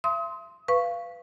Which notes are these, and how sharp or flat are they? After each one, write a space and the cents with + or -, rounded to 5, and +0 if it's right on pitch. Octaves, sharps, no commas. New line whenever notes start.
E5 +40 C6 +0 D#6 +35
B4 +5 F5 -20 C#6 +0